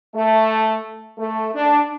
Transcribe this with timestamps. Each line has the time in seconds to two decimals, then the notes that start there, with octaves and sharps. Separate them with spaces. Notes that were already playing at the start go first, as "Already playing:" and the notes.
0.15 A3
1.18 A3
1.55 D4